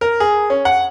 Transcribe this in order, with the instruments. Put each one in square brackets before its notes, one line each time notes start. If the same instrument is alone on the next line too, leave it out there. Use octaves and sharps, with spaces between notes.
[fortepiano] A#4
G#4
C#4
F#5